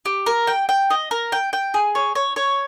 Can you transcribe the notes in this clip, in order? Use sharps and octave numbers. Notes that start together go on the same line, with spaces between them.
G4
A#4
G5
G5
D#5
A#4
G5
G5
G#4
C#5
C#5
C#5